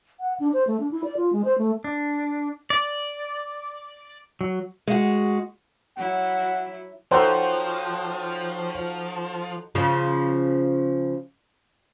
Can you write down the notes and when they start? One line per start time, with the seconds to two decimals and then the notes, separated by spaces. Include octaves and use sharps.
0.20 F#5
0.40 D4
0.53 C5
0.67 A3
0.80 D4
0.91 E4
1.04 D5
1.17 F4
1.33 G#3
1.45 C5
1.58 A3
1.84 D4
2.70 D5
4.41 F#3
4.87 G#3 F#4
5.97 F#3 E4 F#5
7.11 F3 D#4 F#4 A4 C5 C#5 G5
9.75 C#3 F3